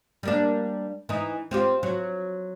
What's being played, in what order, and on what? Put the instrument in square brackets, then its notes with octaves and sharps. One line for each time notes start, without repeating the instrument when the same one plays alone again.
[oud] G3 A#3 D4
E3 D#4
C4 F4 G4
F#3